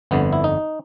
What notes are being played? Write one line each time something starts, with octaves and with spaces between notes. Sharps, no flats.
G1 F2 D3 B3
E4
D#4